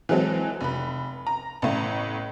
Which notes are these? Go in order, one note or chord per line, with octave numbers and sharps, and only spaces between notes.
E3 F#3 G#3 C4 A4
F1 B5
A#5
A1 A2